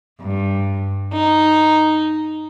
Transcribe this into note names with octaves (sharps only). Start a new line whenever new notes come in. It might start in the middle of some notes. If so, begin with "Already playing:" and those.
G2
D#4